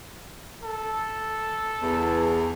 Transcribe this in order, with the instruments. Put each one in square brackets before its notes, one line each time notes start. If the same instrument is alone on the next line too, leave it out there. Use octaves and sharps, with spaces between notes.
[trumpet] A4
[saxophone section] E2